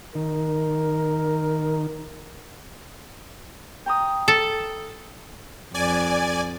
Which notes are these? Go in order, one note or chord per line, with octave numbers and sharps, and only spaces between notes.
D#3 A#4
G5 A#5 D#6
A4
F2 D5 G#5